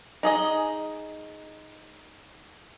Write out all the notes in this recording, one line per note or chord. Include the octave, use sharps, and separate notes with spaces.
D#4 G#4 D#5